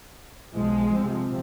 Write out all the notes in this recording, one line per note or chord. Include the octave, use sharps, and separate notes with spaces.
B1 F3 G#3
C3 F3 C4